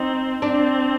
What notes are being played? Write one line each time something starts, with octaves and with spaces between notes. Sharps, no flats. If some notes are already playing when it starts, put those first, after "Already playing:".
Already playing: C4 D#4
C4 D4